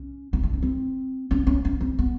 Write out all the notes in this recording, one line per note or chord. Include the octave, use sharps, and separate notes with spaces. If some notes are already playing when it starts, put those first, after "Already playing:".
Already playing: C#4
D#4
D4
C#4
C4
C#4
C#4
C#4
C4
B3